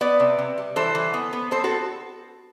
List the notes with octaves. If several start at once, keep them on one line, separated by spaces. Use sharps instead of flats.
B3 B4 D5
C3
C3
G3
E3 A4 C5
E3
B3
B3
C4 A4 C5
F#4 A4